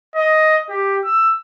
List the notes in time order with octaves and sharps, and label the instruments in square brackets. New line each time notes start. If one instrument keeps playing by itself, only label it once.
[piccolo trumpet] D#5
G4
E6